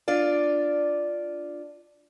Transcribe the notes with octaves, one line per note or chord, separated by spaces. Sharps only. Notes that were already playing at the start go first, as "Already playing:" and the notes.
D4 F4 D5